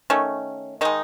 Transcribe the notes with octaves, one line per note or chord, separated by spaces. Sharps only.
D#3 A3 C#4
D#3 G#3 D#4